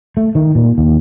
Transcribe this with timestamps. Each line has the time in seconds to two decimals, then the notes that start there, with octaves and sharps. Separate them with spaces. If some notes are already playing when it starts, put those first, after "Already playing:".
0.17 A3
0.35 D#3
0.55 A#2
0.78 D#2